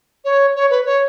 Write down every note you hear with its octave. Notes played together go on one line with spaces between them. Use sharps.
C#5
C#5
B4
C#5